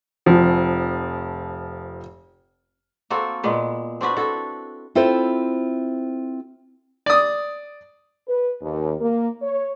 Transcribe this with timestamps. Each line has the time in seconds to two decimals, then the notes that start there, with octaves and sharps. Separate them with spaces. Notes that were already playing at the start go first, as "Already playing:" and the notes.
0.26 F1 F3
3.10 A#3 C4 F#4 A4
3.44 A#2 G#3 B3
4.01 C4 D4 F#4 B4
4.16 E4 F#4 A4
4.95 C4 E4 F4 A4 C5
7.06 D5 D#6
8.28 B4
8.61 D#2
9.00 A#3
9.42 C#5